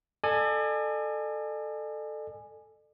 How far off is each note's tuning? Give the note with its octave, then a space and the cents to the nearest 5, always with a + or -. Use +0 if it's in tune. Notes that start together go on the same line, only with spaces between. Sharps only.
A4 +0 D5 +45 G#5 +0